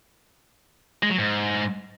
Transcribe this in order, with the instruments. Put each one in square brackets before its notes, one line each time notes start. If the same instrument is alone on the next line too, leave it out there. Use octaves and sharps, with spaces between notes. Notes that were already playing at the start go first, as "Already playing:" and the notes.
[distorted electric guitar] G#3
F#3
G#2